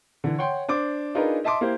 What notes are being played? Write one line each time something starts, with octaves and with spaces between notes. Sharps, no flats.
D3 E3
C#5 F#5 G5 C6
D4 C5 D6
D4 D#4 F4 G#4 A#4 B4
D#5 E5 A5 C6 D6
A#3 E4 G4 C5